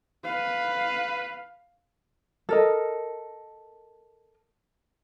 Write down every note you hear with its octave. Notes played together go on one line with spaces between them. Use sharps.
B4 F5
A4 A#4 D#5